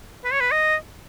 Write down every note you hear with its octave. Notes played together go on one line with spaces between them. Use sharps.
B4
C#5
B4
D#5